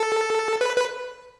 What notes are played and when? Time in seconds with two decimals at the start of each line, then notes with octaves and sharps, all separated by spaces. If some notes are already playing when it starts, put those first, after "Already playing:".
Already playing: A4
0.61 B4
0.76 B4